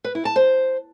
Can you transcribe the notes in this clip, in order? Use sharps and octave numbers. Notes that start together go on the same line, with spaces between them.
B4
E4
A5
C5